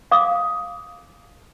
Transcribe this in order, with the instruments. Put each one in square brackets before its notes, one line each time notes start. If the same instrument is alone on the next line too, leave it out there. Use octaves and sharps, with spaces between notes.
[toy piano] F5 D6 D#6